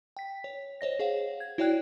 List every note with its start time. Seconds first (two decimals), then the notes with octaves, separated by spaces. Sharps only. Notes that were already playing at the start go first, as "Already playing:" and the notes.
0.17 G5 B6
0.44 C#5
0.81 C5 C#5 D#5 A#6
0.99 G#4 C5 C#5 F5 F#5
1.40 G#6
1.58 E4 F#4 C#5 D5 G5 F#6